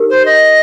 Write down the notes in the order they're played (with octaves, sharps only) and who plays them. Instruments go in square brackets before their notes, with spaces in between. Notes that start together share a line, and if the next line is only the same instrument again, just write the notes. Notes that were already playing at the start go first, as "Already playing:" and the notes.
Already playing: [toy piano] D#4 G4 A#4
[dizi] C5
D#5